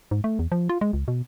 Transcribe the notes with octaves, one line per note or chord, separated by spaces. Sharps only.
G#2
A3
E2
F3
F4
G#3
C#2
B2